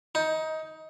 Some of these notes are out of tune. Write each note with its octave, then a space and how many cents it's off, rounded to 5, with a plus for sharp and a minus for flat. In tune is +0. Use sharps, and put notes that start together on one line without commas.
D#4 +20